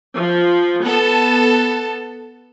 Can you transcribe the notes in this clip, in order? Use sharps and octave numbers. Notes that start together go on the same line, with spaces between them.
F3
B3 A4